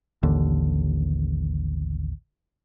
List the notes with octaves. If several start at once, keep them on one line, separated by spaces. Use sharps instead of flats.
A1 D#2 D3